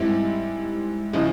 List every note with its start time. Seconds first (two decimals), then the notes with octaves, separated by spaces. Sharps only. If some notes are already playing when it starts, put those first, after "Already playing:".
Already playing: G#2 G3 C4 E4
1.13 C#3 F3 G#3 E4